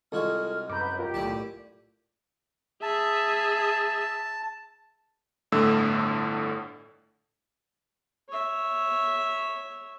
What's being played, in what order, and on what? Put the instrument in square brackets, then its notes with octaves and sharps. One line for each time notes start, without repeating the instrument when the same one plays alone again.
[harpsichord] C2 G#3 F#4 [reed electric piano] F4 A4 [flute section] F6
[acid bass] F#2 [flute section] B4 B5 G6 [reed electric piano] A#5 D6
[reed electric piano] F4 A#4 [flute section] G4
[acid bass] B1 [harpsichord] A2 D5 A5
[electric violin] G#4 E5 [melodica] A5
[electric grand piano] G1 A2 D3 A3 E6
[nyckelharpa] C#5 E5